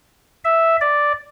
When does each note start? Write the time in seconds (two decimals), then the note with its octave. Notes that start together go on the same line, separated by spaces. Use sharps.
0.45 E5
0.81 D5